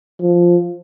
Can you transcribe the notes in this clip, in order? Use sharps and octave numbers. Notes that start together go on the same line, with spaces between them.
F3